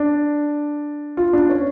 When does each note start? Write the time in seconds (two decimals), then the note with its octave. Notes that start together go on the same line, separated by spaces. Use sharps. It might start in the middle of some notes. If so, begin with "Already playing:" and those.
Already playing: D4
1.17 F4
1.33 D4
1.50 C#4